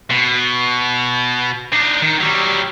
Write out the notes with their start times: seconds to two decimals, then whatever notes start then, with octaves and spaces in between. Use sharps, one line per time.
0.10 B2
1.73 D4 D#4
2.02 D#3
2.21 F#3 G3